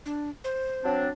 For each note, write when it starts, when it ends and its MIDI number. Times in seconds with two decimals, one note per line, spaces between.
0.06 0.30 62
0.44 1.04 72
0.83 1.09 54
0.83 1.09 60
0.83 1.09 62